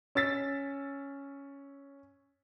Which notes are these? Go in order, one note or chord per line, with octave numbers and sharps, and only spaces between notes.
C#4 E6 A6 B6